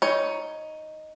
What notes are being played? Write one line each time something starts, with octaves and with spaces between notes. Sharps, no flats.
D#4 C#5